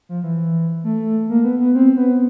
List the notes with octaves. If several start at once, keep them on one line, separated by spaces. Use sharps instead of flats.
F3
E3
A3
A#3
B3
B3
C4
B3